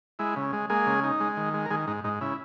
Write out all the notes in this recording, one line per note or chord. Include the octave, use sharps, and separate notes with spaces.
G#3 E4
C#3
G#3
G#3 A#3 G#4
C#3
D#4
G#3
D#3
G#3
A#4
D#3 G#3 G#4
G#2 D#4
G#2 D#4
C#3 E4